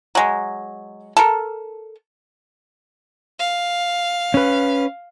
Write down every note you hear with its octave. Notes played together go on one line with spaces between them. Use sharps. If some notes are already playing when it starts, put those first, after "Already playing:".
F#3 G#3
A4 A#4
F5
C#4 B4